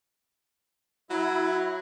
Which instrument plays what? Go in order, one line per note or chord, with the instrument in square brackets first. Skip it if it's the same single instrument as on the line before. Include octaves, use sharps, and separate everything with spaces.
[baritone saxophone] F#3 [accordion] E4